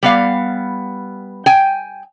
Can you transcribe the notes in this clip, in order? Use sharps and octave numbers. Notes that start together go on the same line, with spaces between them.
G3 B3 F5
G5 G#5